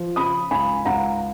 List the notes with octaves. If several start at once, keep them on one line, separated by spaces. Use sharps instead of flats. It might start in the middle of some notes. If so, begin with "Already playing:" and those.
Already playing: F3
C#3 B5 D#6
C#2 G#5 B5
C#2 F#5 A#5